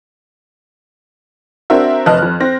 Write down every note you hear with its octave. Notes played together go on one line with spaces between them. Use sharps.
C4 D4 F#4 A#4 E5
F1 B4 D#5 A5 F6 F#6
F2
C4 A#6